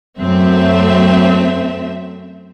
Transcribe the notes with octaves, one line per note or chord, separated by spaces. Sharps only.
F#2 A3 C4 E5